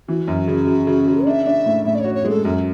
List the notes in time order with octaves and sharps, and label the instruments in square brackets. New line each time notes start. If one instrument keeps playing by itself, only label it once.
[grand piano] E3 [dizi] F#4
[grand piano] F#2
C#3
C#3
C#3
C#3
[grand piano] D4 [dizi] E5
[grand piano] D4
A2
[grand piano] A2 [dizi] E5
[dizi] D5
[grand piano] F#4 [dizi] C#5
[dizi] C#5
[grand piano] G#3 [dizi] A4
[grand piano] F#2 [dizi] F#4